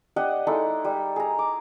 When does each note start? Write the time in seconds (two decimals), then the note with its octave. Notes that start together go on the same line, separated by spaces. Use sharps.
0.16 D4 G4 D#5 F#5
0.47 G#3 D#4 E4 A4
0.84 G3
1.16 G#4 A#5
1.39 D6